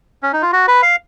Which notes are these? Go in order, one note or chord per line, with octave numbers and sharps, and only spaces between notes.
C#4
D#4
F4
F#4
B4
F5